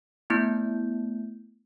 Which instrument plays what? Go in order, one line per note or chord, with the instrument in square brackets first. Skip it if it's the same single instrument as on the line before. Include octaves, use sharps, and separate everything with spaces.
[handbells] A3 B3 E4 G6